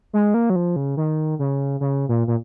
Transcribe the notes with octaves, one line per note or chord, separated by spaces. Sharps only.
G#3
A#3
F#3
F3
C#3
D#3
C#3
C#3
A#2
A#2